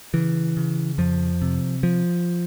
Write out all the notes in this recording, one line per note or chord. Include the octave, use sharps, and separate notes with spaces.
C#3 E3
C#3
F2 F3
C3
F3